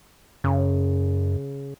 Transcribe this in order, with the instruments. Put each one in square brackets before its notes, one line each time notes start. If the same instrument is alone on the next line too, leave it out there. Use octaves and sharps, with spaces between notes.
[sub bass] F#2 [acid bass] C#3